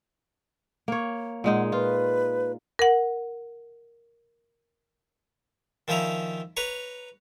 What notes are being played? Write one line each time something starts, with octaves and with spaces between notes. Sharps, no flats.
A#3 C#5
A#2 G#3 D#4 F#5
F4 B4
A#4 F#5
D#3 F3 C#4 E4 A#5
B4 C#5 A#5 C#6